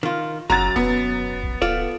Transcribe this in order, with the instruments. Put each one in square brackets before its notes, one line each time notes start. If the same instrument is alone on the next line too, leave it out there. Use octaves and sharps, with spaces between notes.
[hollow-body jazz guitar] D#3 F4
[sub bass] F#1 [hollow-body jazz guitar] F#2 F#3 [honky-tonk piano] A#5 A6
[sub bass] E1 [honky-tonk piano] B3
[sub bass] A#1
[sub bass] D1 [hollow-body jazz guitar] F4 A4 D5